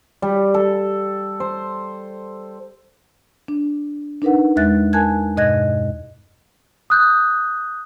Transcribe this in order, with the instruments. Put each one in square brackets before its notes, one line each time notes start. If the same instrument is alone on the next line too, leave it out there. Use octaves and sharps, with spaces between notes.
[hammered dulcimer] G3
A4
C5
[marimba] D4
D4 D#4 A#4 B4 F#5
E2 G#3 E5 F#6 A6
A#4 G#5 A5 F#6 G#6
G2 B2 D#5 F#6 G#6 A#6
[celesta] D#6 F#6 G6